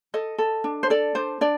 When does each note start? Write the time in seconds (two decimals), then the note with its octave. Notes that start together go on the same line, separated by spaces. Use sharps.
0.14 A4 D#5
0.38 A4
0.64 D4
0.83 C5
0.90 A4 D5
1.15 D4 C5
1.41 D4 D5